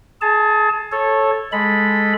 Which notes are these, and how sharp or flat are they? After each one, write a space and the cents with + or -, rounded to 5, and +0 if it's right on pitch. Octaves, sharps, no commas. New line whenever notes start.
G#4 +30 A5 +0
A4 -5 C#5 -15
G#3 +0 A4 +0 B5 -5